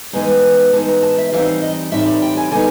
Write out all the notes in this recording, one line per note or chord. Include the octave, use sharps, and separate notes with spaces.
E3 G#3 B3 D#4 G#5
E3 G#3 B3 D#4 A5
A#5
A5
E5
A2 E3 G3 C4 D#4 F5
F5
D#5
A2 E3 G3 C4 D#4 E5
D5
G5
G#5
D3 G3 B3 D#4 G#5